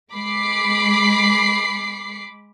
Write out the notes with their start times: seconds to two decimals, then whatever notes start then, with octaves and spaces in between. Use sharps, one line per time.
0.13 G#3 B5 D6 C7